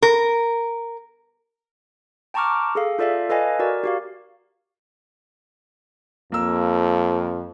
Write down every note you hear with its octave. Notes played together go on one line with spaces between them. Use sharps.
A#4
G5 A5 A#5 C#6 D6 F6
G#4 A4 F5
F4 A4 D5 E5 F5
A4 B4 D#5 F5 G#5
F#4 A#4 D5
F#4 G4 F5
F2 A#3 E6